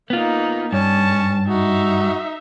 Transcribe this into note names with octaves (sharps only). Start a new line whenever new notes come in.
A#3 B3 D#4 F4
G2 C#4 A5
D#4 F#4 E5